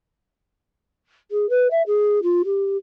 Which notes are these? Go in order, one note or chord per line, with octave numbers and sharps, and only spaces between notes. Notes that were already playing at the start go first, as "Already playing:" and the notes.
G#4
B4
E5
G#4
F4
G4